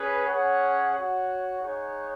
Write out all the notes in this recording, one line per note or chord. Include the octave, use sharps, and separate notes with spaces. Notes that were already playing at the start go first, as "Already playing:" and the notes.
Already playing: C#4 G#4 B4
C#4 G#4 C#5 F#5
F#4 C#5 F#5
D#4 G#4 C#5 F#5